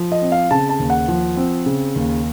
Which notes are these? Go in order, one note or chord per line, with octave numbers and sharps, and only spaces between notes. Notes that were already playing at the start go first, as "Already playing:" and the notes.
Already playing: F3
D#5
C4
F5
C#3 A5
A5
D#2
F#5
F3
C4
C#3
D#2